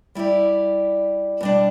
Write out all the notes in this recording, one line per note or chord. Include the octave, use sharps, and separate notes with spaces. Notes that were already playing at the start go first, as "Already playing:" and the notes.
G3 E4 G4 D5
B2 G3 D4